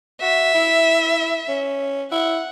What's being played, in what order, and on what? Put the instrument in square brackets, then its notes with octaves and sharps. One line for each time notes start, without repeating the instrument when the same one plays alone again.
[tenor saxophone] F#4 [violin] E5
[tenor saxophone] E4
C#4
[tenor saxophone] E4 [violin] F#5